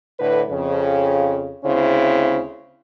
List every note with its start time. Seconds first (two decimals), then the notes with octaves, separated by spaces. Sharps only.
0.19 A2 D3 B4
0.50 F2 C#3
1.64 D2 C#3 C4 E4